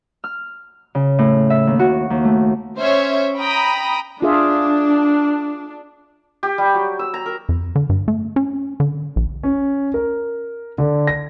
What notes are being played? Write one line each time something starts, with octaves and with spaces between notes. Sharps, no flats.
F6
C#3
A2
E5
D#2
F#4
D#2
A3
C#4 C5 C#5 E5
G5 A#5 B5 D#6
D4 F4 G#4 E5
G4
G3
F#3
E6
A#5
A#4
F2
D3
G2
A3
C#4
D3
A#1
C#4
A#4
D3
A#6